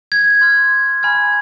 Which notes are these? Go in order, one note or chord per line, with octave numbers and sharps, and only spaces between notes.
G#6
C6 F6
G#5 B5 F6 G#6